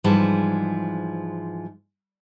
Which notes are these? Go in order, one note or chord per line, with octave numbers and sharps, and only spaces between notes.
G#2 E3 F3 G3 G#3 A5